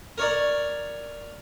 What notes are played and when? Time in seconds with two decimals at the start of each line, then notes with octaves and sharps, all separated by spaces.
0.18 A#4 C#5 D5